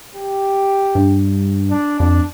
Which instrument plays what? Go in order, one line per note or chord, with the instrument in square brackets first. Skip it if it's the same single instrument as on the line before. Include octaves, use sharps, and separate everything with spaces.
[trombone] G4
[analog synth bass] G2
[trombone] D4
[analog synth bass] F2 [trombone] D4